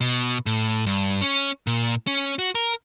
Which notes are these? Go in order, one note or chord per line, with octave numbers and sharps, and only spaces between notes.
B2
A2
G2
C#4
A#2
C#4
F#4
A#4